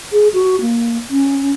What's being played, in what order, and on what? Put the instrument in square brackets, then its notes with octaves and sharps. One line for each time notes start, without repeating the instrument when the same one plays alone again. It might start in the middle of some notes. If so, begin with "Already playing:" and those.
[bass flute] G#4
F#4
A#3
C#4